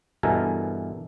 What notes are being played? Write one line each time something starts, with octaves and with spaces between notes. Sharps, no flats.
G2 B2 E3 A4 A#4 G#5